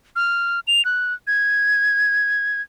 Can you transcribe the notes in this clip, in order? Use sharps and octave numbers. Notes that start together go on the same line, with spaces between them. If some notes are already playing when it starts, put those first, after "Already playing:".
F6
F7
F#6
G#6